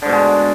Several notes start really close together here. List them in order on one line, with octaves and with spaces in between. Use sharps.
D3 G#2 B2 G#3